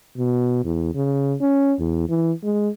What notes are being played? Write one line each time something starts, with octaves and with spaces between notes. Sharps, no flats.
B2
E2
C#3
C#4
E2
E3
G#3